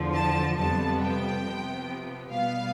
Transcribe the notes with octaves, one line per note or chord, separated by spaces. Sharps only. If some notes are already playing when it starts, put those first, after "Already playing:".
Already playing: E2 D3 F3
A5
F2 C3 G3 B3 A5
G5
C3 F3 B3
B2 G3 B3 F5